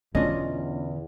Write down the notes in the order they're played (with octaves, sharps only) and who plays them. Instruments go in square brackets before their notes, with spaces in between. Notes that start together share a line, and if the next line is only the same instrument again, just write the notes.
[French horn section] E2 [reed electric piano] B2 C#4 D4 [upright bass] D3 [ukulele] F4 D#5